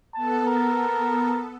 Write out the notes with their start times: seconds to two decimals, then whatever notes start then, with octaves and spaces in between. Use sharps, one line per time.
0.15 B3 A4 A5
0.47 A#4